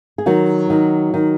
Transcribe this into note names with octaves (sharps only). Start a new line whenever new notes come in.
G#4
D#3 F#3 F#4
D#3
D#3